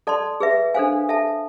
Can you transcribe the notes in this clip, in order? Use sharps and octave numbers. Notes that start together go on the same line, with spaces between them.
A4 D5 A5 C6
G#4 B4 E5
D4 A4 C5 F5 G#5
A4 E5 A5